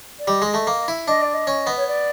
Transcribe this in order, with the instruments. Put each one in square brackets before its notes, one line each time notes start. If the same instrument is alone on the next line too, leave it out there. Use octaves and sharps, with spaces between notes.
[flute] D5
[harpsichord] G3 [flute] D#5
[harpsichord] G#3
A3
A#3
E4
[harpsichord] D4 [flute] D#5
[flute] D5
D#5
[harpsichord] C#4
B3
[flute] C#5
D5